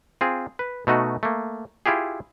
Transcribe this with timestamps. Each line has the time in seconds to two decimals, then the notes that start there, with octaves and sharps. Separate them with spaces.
0.21 C4 F4 G#4
0.59 B4
0.87 B2 A3 D#4 F#4
1.23 A3 A#3
1.86 E4 F4 G4 G#4